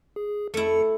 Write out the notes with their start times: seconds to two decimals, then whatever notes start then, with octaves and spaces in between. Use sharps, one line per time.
0.16 G#4
0.54 F2 A3 E4 A4 C#7